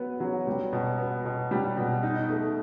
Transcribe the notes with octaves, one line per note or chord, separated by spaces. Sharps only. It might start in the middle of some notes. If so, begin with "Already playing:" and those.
Already playing: F#3 B3 B4
F#3
G3
B2
B3
B2
G3
B2
D#4
A3